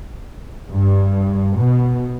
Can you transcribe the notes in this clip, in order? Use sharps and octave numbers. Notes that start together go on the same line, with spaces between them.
G2
B2